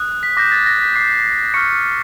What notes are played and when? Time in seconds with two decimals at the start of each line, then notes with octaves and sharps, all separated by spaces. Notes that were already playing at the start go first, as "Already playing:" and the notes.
Already playing: D#6 F#6
0.23 B6
0.37 D6 G6 A#6
0.52 A6
0.66 A#6
0.81 B6
0.96 D6 G6 C7
1.54 C#6 F6 C#7